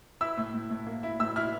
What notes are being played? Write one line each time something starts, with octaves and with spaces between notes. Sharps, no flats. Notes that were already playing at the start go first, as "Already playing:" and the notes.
E4 E6
A2
A2
A2
A#3
E4
A2 E6
E4 F6